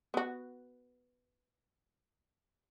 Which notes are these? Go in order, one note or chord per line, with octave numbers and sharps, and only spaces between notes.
B3 F#4